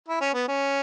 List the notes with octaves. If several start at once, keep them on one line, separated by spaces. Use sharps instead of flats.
E4
C#4
B3
C#4